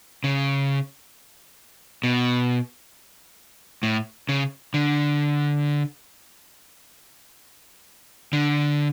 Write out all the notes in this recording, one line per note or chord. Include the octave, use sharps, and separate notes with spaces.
C#3
B2
A2
C#3
D3
D3